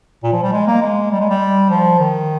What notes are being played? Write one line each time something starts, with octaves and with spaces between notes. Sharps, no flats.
A#2
F3
G3
G#3
A#3
G#3
G3
G#3
G3
F3
D#3